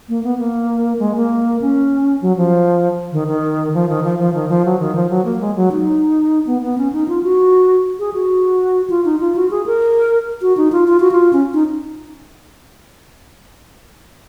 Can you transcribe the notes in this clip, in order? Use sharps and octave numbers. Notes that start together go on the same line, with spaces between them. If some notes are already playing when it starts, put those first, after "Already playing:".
A#3
B3
A#3
G#3
A#3
C#4
F#3
F3
D#3
D#3
F3
D#3
F3
F3
D#3
F3
F#3
D#3
F3
F#3
A#3
G#3
F#3
D#4
B3
B3
C#4
D#4
F4
F#4
G#4
F#4
F4
D#4
F4
F#4
G#4
A#4
F#4
D#4
F4
F4
F#4
F4
C#4
D#4